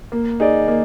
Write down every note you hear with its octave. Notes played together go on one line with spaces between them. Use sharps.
A#3
D#4 G#4 D5
A#3